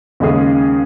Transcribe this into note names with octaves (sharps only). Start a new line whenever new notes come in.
D#2 C#3 G#3 C#4 G#4